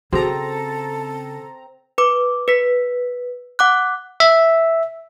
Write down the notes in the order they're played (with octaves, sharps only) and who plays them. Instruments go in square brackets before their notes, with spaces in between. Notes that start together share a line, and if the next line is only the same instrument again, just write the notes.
[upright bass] C#3 [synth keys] C4 A#5 [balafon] F#4 G#4 [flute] A4
[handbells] B4 D6
B4 B6
F#5 D6 F#6
[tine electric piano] E5